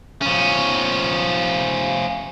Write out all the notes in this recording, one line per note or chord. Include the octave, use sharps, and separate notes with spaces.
F3 C#4